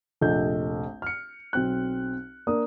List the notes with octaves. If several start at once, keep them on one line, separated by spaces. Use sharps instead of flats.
F1 A#1 A4 D#5 G6
F6 C#7
B1 C4 F#6
A#3 D4 D#6